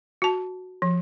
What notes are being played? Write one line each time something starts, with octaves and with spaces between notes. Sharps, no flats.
F#4 A5
F3